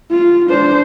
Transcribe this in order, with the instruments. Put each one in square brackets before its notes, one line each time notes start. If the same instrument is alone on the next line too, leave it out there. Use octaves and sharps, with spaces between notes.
[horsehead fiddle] F4
D4 C5